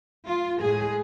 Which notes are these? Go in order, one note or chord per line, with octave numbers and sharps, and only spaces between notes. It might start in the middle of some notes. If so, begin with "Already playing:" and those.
F4
A2 G#3 G#4